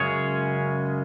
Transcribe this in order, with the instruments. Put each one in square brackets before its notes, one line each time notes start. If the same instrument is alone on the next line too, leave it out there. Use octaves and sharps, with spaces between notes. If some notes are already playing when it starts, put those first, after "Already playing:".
Already playing: [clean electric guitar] F#2 C#3 G#3 C#4 G#4 C#5